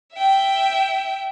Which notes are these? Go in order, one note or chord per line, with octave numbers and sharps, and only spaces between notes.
E5 G5